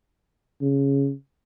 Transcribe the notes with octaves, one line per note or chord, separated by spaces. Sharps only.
C#3